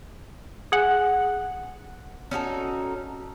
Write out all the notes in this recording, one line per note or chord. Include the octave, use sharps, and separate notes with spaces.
G#4 F#5
C#4 D#4 F#4 A4